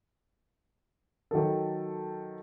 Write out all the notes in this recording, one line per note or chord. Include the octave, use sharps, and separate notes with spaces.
D#3 F#3 A4